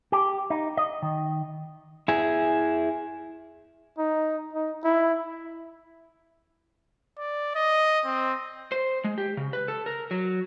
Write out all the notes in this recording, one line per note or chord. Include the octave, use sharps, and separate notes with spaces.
G4
D#4
D#5
D#3
E4 G#4
D#4
D#4
E4
D5
D#5
C4
C5
G#3
G4
C#3
B4
A4
A#4
F#3